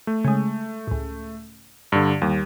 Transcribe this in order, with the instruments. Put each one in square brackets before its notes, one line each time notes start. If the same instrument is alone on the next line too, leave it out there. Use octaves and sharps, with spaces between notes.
[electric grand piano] A3
[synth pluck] C#3 G#3
C#2 A2
[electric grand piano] G2 D3
[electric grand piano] D#2 [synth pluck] G3